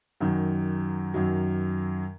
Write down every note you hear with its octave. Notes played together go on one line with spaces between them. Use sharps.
F#2 D#3 F#3
F#2 D#3 F#3